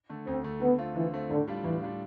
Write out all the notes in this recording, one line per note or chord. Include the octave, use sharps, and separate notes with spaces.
D3 A3
D2 C4
D3 A3
D3 B3
A3 C4 F4
D3 E3
A3 C4 F4
A2 D3
G3 D4 F4
A2 E3
G3 D4 F4